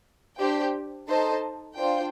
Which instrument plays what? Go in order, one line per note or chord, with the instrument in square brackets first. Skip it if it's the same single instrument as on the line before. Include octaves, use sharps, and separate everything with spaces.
[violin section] D4 G4 C5 G5
D#4 A4 C5 D#5 A5
D4 F4 C5 G5